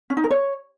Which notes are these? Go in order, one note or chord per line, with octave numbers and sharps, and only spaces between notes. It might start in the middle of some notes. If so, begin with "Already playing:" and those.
C#4
D#4
A#4
C#5